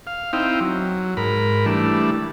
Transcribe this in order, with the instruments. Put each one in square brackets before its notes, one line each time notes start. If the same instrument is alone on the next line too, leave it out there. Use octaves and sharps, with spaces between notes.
[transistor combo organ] F5
C4 D#4 E4 F5 G5
F#3
G#2 A#4 B5
E3 G3 A3 D4